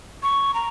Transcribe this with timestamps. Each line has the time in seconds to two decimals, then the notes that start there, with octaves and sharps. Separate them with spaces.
0.23 C#6
0.54 A#5